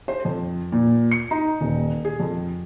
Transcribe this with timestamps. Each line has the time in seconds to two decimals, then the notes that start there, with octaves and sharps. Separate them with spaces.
0.08 C5
0.25 F2
0.72 A#2
1.11 C#7
1.31 D#4
1.61 D#1
2.05 G#4
2.20 F2